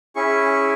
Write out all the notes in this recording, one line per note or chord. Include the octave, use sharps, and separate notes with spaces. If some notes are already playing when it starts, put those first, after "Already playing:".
C#4 E4 G#4 C#6